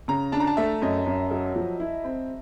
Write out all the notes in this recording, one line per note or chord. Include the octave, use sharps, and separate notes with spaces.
C#3 A#5
D4 A5
A#5
A5
A3 E5
F#2 D#5
F#2
F#3
F3
E4
C4